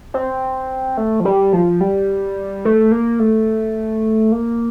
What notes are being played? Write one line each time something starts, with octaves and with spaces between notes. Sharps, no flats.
C4
A3
F3
G3
F3
G3
A3
A#3
A3
A#3